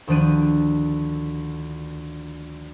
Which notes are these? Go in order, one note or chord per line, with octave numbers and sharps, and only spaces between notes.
D2 D#3 F3 D4 F#6 D#7